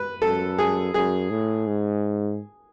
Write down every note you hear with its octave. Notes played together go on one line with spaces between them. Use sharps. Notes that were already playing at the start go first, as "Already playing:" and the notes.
Already playing: B4
F#2 A4
G#4
F#2 G#4
A2
G#2